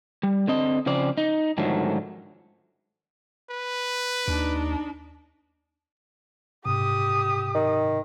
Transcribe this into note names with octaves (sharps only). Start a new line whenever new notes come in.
G3
D3 C4 D#5
C#3 F3 C4 D5
D#4
G#2 D3 D#3 F3 F#3 A3
B4
D#2 D4 D#4
G#2 C3 G4 D#6
D#3